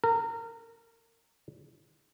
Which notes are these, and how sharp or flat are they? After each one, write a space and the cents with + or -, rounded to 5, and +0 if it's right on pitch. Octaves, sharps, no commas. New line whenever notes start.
A#4 -25